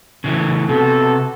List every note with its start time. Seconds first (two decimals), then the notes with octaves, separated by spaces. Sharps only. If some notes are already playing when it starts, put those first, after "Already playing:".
0.24 C#3 E3 A3
0.69 C3 B3 F#4 A4